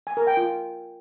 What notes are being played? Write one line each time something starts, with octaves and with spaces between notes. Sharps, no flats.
G#5
A#4
G5
F4